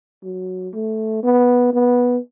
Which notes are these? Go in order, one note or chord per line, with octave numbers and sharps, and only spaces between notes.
F#3
A3
B3
B3